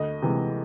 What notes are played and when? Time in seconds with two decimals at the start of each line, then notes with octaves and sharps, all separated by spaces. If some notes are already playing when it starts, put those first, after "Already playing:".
Already playing: D2 D#5
0.22 C3 E3 G#3